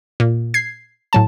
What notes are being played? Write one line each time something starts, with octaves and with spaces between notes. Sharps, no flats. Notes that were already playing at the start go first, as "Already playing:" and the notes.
A#2
G#6 C7
A2 F#3 A5